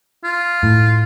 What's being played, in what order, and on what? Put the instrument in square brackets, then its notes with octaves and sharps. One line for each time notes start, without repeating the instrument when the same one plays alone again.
[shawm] F4
[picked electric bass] A2